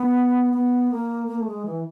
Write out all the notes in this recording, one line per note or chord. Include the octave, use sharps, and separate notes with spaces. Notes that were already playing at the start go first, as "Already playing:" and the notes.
Already playing: B3
B3
A#3
A#3
A3
G#3
E3